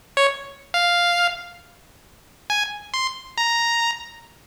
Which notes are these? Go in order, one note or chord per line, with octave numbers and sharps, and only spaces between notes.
C#5
F5
G#5
C6
A#5